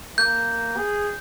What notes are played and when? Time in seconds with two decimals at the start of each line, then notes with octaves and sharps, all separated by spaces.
0.18 A#3 G6
0.77 G#4